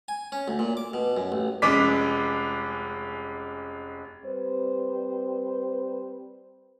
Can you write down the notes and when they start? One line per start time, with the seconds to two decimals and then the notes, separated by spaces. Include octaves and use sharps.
0.08 G#5
0.32 C#4
0.48 D2
0.59 A#2
0.77 D6
0.94 B2
1.17 F#2
1.32 A1
1.62 F1 G#3 C#4 D6 B6
4.25 G3 C4 B4 C5